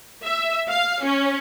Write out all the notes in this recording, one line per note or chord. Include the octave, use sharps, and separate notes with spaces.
E5
F5
C#4